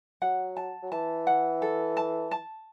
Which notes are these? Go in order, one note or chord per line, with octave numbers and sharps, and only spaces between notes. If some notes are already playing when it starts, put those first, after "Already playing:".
F#3 F#5
A5
F#3
E3 A5
F#5
A4
A5
A5